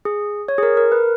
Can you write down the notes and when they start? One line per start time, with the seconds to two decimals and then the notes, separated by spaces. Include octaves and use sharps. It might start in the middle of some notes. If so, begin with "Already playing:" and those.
0.05 G#4
0.48 C#5
0.58 G#4
0.63 A#4
0.77 A#4
0.92 B4